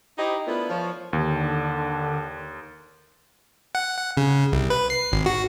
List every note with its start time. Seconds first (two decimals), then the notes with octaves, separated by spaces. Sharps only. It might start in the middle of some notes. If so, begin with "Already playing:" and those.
0.18 D#4 E4 G4 C5 D#5
0.46 A3 B3 D4 E4 F4 A#4
0.70 F3 C#5
1.13 D#2 D3
3.75 F#5
3.97 F#5
4.17 C#3
4.52 C2
4.70 B4
4.90 C7
5.12 G#1
5.26 F#4